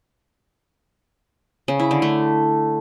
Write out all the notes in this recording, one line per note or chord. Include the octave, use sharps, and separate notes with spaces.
C#3
E4
D3
A3